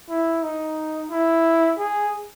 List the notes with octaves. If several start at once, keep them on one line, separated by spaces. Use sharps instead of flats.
E4
D#4
E4
G#4